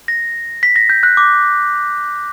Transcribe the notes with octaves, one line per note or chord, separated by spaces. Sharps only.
A#6
B6
A#6
G6
F#6
D6